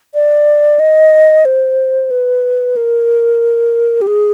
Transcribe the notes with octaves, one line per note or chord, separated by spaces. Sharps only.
D5
D#5
C5
B4
A#4
G4
G#4